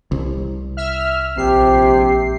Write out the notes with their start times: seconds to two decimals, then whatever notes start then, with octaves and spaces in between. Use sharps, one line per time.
0.12 C2
0.77 E5 F6
1.37 A#1 C3 G4 C7